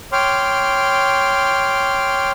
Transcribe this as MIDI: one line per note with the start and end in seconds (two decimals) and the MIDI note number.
0.12 2.31 73
0.12 2.31 79
0.12 2.31 84
0.12 2.31 86
0.12 2.31 89